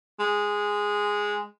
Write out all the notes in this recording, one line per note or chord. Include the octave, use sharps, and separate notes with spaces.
G#3